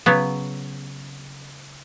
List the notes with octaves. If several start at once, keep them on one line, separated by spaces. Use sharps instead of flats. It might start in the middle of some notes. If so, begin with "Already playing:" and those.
C#3 F#3 B3